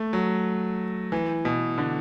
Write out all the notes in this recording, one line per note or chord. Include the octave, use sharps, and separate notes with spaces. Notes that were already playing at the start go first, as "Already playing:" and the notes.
Already playing: A3
F#3
E3
B2
D3